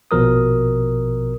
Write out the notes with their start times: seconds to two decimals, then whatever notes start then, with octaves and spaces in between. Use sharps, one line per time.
0.11 A#1 B2 F3 A#4 D#6